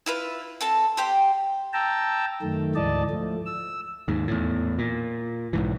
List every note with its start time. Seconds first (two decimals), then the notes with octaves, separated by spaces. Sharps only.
0.06 E4 F4 B4
0.61 C4 A4 A5
0.97 G4 C5 G5
1.73 G5 A5 A#5 E6
2.42 F#2 D#3 A3
2.75 D2 G#2 E3 D5 D#5 A5
3.10 F3 A3
3.45 E6
4.08 D#2 G#2
4.28 E2 A2
4.79 A#2
5.53 B1 G#2 E3